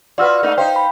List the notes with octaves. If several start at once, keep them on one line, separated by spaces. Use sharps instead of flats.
F4 F#4 B4 D5 E6 F6
A3 A#3 D#4
D#4 C5 F5 G5
B5